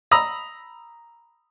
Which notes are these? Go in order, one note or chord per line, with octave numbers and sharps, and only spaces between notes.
A#5 B5 D#6 E6